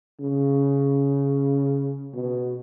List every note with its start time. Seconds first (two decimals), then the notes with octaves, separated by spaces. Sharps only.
0.20 C#3
2.14 B2